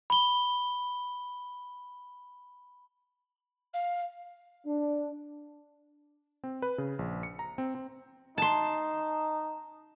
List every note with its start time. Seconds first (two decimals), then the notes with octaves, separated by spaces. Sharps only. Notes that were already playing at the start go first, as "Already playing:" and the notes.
0.10 B5 G7
3.73 F5
4.66 D4
6.44 C4
6.62 B4
6.78 C#3
6.99 A#1
7.23 C#7
7.39 A#5
7.58 C4
7.75 C4
8.38 D#4 A5 C6